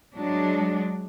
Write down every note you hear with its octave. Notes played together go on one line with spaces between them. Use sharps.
F#3 G#3 D4